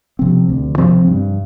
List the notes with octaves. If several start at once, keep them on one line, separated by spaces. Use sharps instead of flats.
C3 F3 C4
D2
C3 F3 C4
G2